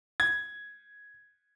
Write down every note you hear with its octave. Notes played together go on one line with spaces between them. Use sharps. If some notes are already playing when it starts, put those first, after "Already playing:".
G#6